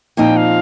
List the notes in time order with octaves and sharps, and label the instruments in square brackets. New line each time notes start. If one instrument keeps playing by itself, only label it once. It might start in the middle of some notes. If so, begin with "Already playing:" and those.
[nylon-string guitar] A#2 F3 C4 D#4 [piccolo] G5
[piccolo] F5